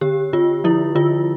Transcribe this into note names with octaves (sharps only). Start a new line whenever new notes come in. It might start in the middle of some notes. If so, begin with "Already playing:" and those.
D3 G4
D3 F4
F3 E4
D3 F4